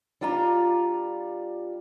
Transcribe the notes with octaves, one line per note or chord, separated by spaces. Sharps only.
G3 D4 F4 F5 A#5